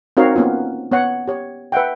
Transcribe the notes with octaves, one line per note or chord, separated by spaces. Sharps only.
C4 D#4 F#4 A#4 C#5 F5
A#3 B3 C#4 F4
B3 C#5 F#5
G4 C#5
B4 E5 F#5 G5